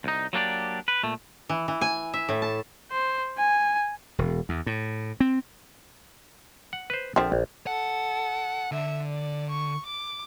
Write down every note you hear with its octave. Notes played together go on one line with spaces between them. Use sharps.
C2 D#4
F#3 A#3 D4 G4 D5
B4
A#2 A3
E3
E3
G#5
E5
A2
A5
C5
G#5
E1
E2
A2
C4
F#5
B4 C5
A#1 D3 F3 C4 E5
A#1
A4 F#5
D3 E5
D5
C#6
D6